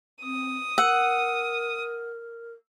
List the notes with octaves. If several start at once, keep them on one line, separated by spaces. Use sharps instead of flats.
C4 D#6
A#4 F#5 E6